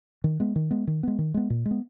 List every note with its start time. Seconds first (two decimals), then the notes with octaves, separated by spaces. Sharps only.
0.24 D#3
0.40 G#3 B3
0.56 D#3
0.71 G#3 B3
0.87 D#3
1.03 G#3 B3
1.19 D#3
1.34 G#3 B3
1.50 A#2
1.65 G#3
1.71 B3